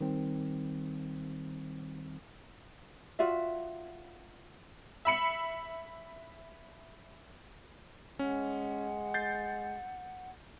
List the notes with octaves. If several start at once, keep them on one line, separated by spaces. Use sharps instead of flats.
D#3 G3 C4
F4 F#4 D5 E5
E5 B5 C#7
G#3 C#4 F#5
G6 A6 C7